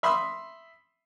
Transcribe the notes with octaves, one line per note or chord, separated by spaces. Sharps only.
E5 B5 C6 D#6 E6